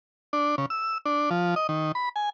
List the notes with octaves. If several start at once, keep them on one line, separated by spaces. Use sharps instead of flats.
D4
C#3
E6
D4
F3
D#5
D#3
B5
G#5